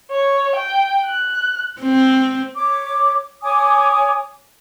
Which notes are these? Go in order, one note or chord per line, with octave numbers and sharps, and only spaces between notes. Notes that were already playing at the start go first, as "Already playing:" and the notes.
C#5
G5
F#6
C4
C#5 D6
C#5 G#5 D6 D#6